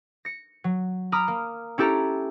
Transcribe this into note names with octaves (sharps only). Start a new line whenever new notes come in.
A#6 C#7
F#3
A#5 B5 D6 D#6 F6
A#3
C#4 E4 G4 A4 A#5